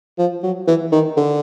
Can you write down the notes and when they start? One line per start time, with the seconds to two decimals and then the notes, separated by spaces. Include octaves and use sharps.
0.18 F3
0.43 F#3
0.67 E3
0.92 D#3
1.17 D3